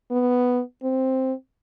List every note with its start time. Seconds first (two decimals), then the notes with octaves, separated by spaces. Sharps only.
0.11 B3
0.83 C4